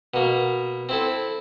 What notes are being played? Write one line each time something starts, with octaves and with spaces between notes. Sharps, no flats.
B2 A#3
C4 E4 A4